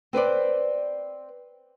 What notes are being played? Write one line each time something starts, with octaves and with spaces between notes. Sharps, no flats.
C4 B4 C5 D5